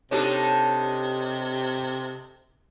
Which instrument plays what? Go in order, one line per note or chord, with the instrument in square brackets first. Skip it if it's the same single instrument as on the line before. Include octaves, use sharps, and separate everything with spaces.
[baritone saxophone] C3 [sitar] D4 D#4 A4 [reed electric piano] G4 C#5